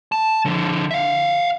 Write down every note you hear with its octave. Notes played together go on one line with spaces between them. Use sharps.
A5
D3 F3
E5 F5